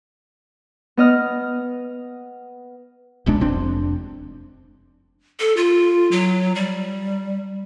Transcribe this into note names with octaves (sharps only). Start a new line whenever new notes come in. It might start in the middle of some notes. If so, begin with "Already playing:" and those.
B3 D#5 F6
D#1 B1 G#3 D4
F1 C4 D4
A4
F4
F#3
G3